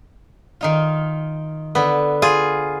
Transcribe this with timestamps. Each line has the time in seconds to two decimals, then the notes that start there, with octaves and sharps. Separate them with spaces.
0.61 D#3 D#4 F4
1.75 D3 B3 B4 B5
2.22 F4 G#4